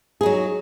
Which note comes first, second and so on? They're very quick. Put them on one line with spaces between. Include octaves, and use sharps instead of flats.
G#4 D#4 F#3